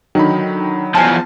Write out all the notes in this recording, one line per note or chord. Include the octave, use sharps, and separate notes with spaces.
D3 D#3 F#3 D#4 B5
E2 F3 G#5 A5